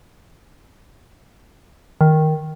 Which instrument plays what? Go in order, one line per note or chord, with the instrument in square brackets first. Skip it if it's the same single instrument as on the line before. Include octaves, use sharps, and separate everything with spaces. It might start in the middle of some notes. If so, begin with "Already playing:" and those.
[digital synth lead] D#3